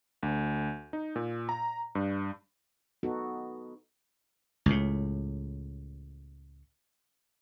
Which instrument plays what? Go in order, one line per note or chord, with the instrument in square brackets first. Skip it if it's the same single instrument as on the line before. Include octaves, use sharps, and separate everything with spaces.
[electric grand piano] D2
D#4
A#2
A#5
G2
[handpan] B3 D#4 F#4 A4
[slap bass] C#2 A2